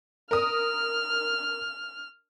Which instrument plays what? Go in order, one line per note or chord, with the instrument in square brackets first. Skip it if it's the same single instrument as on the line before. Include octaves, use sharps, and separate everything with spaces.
[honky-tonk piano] A#4 D#6 [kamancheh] F6